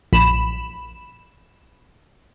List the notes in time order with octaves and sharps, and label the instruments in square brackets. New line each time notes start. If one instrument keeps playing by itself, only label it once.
[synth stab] A#1 B5 E7